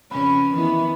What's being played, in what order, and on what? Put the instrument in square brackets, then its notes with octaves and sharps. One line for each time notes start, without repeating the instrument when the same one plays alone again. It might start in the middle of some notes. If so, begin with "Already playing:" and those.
[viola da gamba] F2 C#3 C#4 [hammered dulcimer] B4
[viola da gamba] D#3 B3 [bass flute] E3